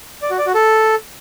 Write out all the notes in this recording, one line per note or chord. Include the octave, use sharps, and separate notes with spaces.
D5
F#4
D5
F#4
A4